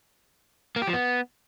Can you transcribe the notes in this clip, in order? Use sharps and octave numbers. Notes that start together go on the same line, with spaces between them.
A#3
G4
F3
B3